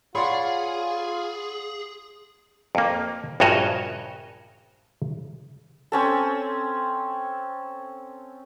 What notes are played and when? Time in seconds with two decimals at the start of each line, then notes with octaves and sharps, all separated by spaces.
0.15 F4 G#4 C#5 D5 F5 F#5 B5 C6
2.75 F2 A#3
3.40 A#1 G2 C#3 F#4 C#5 D#5
5.92 C4 C#4 A4